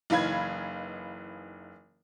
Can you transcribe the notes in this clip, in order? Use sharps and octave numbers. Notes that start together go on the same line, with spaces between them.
F#1 E3 D#4 F5 B5 G#6